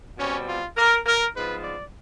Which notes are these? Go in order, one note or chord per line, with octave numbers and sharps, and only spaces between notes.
B2 G3 C4 C#4
F4
A#4
A#4
G#2 F3 G#3 B3 B4
D5